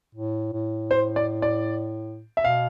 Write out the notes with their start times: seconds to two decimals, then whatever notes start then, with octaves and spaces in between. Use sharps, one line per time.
0.15 A2
0.53 A2
0.91 C5
1.16 D5
1.42 D5
2.37 E5
2.44 B2 F5